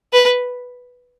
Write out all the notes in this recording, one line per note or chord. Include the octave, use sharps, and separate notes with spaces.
B4